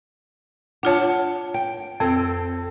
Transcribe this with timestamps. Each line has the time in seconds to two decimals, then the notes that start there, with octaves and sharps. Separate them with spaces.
0.83 D4 F4 C#5 F#5 A5
1.54 G5
2.00 F2 C4 A4